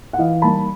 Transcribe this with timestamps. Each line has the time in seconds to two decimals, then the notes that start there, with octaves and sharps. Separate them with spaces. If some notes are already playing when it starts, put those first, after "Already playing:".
0.13 F#5
0.18 E3 D#5 F5
0.42 G3 A#3 D#4 A5 B5